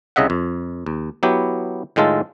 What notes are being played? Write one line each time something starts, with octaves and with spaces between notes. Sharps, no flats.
C2 C#3 D#5 E5 F#5
F2
D#2
F#3 B3 E4 G4
A2 D#3 G#3 F4 A4